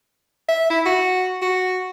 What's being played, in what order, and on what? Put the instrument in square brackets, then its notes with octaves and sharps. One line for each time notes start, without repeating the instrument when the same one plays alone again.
[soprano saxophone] E5
E4
F#4
F#4